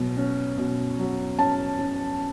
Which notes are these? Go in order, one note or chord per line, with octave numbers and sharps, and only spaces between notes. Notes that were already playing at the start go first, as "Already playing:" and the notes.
Already playing: B2 F#3
C#4
B2
F#3
C#4 A5
C#4